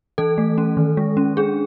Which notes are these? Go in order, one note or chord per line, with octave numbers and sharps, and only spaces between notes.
E3 A4
A3
C#4
D#3
G#3
C#4
D4 G#4